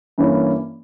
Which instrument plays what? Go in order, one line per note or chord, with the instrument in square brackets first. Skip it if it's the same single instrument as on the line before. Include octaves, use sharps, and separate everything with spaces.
[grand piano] G2 E3 A#3 C#4